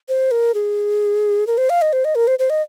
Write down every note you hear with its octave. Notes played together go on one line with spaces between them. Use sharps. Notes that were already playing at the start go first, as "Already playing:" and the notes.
C5
A#4
G#4
A#4
C5
F5
D#5
C5
D#5
A#4
C5
C5
D#5